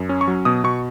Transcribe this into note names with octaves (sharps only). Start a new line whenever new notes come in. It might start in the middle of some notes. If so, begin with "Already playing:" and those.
Already playing: F#2
C#4
C#6
F#3
B2 D#6
B2 C#6